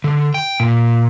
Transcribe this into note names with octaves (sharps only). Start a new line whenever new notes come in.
D3
G5
A#2